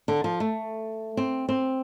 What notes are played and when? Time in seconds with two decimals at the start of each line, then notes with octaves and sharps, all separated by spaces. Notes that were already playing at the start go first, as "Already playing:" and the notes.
0.08 D3
0.24 F3
0.40 A3
1.17 C4
1.49 C4